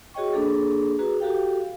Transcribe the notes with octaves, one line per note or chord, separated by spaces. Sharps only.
F#4 G#4 C#5 D#5 G5 C#6
A#3 D4 G#4 A4
F#4 G#4 B4 A#5
F#4 G4 A4 F5 G5
F5